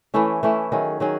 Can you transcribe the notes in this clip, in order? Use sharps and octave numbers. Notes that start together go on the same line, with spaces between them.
E3 A3 C#4 E4
E3 A3 C#4 E4
D#3 F#3 C#4 G#4
D#3 F#3 C#4 G#4